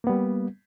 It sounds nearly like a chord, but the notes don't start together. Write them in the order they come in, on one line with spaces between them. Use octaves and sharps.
A#3 B3 G3